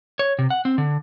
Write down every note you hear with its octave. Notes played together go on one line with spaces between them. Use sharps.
C#5
C3
F#5
C4
D3